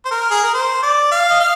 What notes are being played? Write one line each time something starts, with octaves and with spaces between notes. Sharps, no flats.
C5
A#4
G#4
A#4
C5
D5
F5
D#5
F5